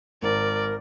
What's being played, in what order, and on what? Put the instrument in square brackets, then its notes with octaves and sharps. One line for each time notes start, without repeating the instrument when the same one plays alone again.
[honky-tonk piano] G#1 [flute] A#4 [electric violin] D5